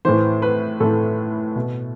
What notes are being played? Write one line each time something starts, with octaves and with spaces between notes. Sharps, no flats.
A2 E3 C5
B4
A2 E3 A4
B2